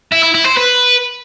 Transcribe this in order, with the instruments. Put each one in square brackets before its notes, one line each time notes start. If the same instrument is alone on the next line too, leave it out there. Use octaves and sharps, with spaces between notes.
[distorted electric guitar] E4
E4
E4
C5
B4